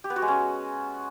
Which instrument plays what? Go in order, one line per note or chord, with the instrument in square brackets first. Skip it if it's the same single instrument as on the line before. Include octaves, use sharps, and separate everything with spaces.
[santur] G4
B3
F#4
G#3
C#4